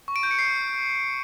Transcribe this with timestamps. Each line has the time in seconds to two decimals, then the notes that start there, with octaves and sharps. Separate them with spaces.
0.08 C#6
0.16 D7
0.23 G6
0.31 C#7
0.39 C7